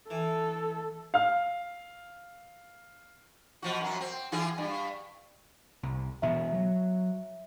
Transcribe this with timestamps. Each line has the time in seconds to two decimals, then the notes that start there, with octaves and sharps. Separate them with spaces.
0.10 E3 A4
1.14 F5 F6
3.62 B2 F3 F#4
3.81 F#2 F#3
4.01 C4
4.32 E3 F4 G#4
4.58 G2
5.83 C2
6.22 E1 B2 B3 E5
6.53 F#3